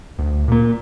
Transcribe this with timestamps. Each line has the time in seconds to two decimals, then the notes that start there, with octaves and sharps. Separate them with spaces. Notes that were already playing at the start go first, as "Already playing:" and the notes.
0.19 D2
0.48 A#2 A#3